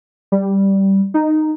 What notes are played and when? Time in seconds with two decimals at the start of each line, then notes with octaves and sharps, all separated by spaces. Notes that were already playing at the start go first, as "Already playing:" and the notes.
0.32 G3
1.14 D#4